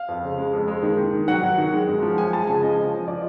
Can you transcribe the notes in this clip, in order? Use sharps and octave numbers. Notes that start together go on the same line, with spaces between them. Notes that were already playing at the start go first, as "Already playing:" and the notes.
Already playing: F5
F2
C#3
G#3
F2
G#3
D#3
D#3
D#3
F#3 F#5
F#3
D#3
G#3
F#2
F3
G#3 G#5
G#3 A5
C#3 G#5
F3 D#5
F3
F3
F3 D5